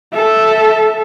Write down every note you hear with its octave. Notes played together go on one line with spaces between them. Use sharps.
A4 E5